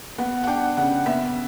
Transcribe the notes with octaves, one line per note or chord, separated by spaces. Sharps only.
B3 F#5
F#5
D4 G5
C#3 F#5
B3 E5